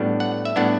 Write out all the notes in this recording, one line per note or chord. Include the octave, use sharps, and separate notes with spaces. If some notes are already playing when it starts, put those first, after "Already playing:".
Already playing: A2 G3 B3 D4
F#5
E5
A2 G3 B3 D4 F#5